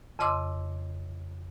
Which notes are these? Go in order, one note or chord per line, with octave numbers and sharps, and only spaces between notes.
F2 C#3 D#5 C6 D6 E6